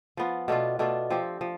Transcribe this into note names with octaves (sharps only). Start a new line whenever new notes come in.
F3 B3 F4
B2 A3 D4 F4
B2 A3 D4 F4
F3 C4 G4
F3